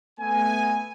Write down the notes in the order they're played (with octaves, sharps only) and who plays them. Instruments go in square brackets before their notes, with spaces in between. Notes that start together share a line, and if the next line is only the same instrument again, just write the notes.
[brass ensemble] A3 B3 G#5